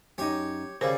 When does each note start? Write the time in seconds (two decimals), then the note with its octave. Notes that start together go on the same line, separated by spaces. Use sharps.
0.18 F#2 D#4 G4 C#5
0.81 C#3 G3 G#4 A#4 C5